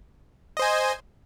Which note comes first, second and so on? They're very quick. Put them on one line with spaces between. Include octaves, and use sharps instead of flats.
D#5 C5 G#5